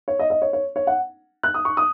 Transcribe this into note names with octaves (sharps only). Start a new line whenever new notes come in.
C#5
D#5
D#5
C#5
C#5
C#5
F#5
F#6
D#6
C#6
D#6